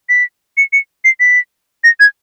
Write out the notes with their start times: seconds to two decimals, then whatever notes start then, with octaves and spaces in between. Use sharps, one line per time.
0.09 B6
0.57 C#7
0.73 C#7
1.04 C7
1.20 B6
1.84 A#6
2.00 G#6